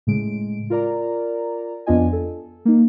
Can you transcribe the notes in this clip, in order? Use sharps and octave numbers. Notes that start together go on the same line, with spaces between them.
A2 C#3 G#3 D7
F4 A#4 D5 A#5
F2 B3 D4 F4 D#5 G#5
A4
A#3 D#4